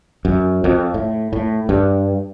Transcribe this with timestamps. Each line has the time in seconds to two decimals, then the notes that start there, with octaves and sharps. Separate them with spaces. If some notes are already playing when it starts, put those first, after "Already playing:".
0.25 F#2
0.64 F2
0.94 A2
1.33 A2
1.69 G2